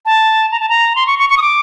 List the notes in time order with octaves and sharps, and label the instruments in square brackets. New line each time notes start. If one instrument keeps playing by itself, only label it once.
[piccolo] A5
A#5
A5
A#5
C6
C#6
C#6
C#6
D#6
D6